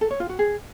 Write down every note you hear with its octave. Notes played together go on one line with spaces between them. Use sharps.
A4
C#5
F4
F#4
G#4